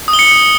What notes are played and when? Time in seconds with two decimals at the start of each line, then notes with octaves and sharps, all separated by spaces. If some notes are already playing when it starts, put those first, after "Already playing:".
0.08 D#6
0.13 G7
0.19 C#7